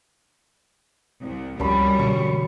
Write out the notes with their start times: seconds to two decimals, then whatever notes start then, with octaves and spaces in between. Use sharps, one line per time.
1.23 C2
1.60 C#2 F#2 F3 G3 B5
1.99 B2 D3 E3 C#6